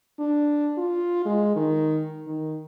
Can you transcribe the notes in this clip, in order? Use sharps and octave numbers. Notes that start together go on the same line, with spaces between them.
D4
F4
G#3
D#3
D#3